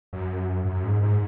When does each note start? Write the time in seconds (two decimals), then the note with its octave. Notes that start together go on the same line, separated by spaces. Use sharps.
0.13 F#2
0.65 F#2
0.83 G#2
1.02 G#2